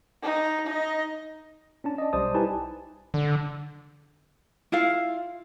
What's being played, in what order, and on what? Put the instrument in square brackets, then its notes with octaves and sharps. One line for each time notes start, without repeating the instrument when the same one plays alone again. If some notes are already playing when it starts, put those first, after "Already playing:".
[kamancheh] D#4
D#4 D#5
[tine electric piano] C#4 D4 A5
D5 D#5
B1 G3 C5 D5 A5 D#6
D#4 E4 G4 B4 G#5 A5
[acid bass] D3
[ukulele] E4 F4 F5